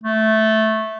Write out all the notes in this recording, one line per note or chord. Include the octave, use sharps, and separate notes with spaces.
A3